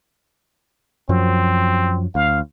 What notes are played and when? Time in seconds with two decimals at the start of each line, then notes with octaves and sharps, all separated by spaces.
1.09 F#2 F3 F#3 C4
2.15 D2 F5